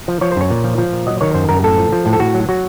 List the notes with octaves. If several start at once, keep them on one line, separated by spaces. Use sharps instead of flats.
F3
F3 C#5
C5
F#2 C#5
A#2
F3
F3
A#2
F#3 D#5
D#3 C#5
F#2 C5
F#2 A#4
A2 A4
F3
F3
A2
A4
A2 F#4
F#3
F#3 F#4